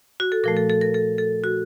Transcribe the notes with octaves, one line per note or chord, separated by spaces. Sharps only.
F#4
A4
A#2 F3 A3 A#4
A4
A4
A#4
A4
A4
F#4